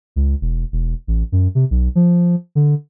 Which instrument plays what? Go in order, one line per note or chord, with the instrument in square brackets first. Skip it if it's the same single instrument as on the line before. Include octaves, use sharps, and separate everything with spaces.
[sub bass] C#2
E1
E1
A1
F#2
C3
B1
F3
D3